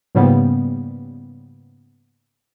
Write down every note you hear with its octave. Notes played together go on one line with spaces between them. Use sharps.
G#2 C#3 F3 G3 A#3 B3